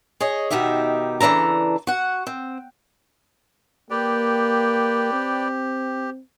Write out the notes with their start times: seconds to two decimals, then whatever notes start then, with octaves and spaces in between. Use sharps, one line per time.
0.20 G#4 C#5 D#5
0.50 B2 D#3 D#4 G4 E5
1.20 C#3 E3 D4 A4 A#5
1.87 F#4 F#5
2.27 C4
3.90 A#3 G4 B4 D5 G5
5.13 C4